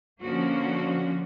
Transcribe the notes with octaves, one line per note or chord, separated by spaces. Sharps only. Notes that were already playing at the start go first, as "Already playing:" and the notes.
D3 F3 A#3 C#4 F#4